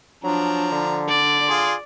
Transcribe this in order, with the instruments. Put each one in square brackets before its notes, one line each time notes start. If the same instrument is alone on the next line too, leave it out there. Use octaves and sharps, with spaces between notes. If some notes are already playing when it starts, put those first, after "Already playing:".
[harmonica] F3 A#5 [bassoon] F#3 [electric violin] D4
[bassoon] D3
[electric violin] D5
[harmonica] F4 G#4 C6